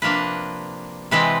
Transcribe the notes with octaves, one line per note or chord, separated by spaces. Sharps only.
C3 F3 A#3 D4 B4
C3 E3 G#3 C4 B4